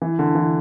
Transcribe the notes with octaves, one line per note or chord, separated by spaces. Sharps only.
E3
D3
E3